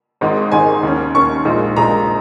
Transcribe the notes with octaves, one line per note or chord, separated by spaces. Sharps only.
G#1 G#2 D#3 G#3 D#4
G#1 G#2 D#3 G#3 D#4 G#5
D#2 D#3 C#4
D#2 D#3 C#4 C#6
A#1 A#2 G#3 D#4
A#1 A#2 G#3 D#4 A#5